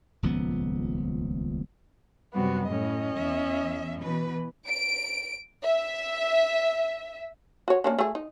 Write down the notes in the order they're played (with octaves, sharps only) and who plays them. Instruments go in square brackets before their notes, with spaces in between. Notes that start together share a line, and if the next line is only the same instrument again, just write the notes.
[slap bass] D#1 C#2 F3 B3
[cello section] F#2 C3 G3 [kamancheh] B3 F#4
[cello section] A2 [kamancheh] C#4 D#5
[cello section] E2 E5
B2 E3 B4
[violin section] D7
E5
[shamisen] F#4 C#5
A#3 C#4 D4
A3 G#4
D#4